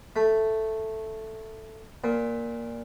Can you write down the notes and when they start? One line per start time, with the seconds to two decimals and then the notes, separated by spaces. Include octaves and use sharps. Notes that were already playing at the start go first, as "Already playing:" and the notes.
0.16 A3
2.04 A#2